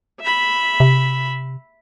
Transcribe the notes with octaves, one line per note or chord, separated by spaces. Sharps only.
E5 B5
C3